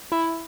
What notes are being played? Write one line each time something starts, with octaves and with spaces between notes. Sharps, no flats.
E4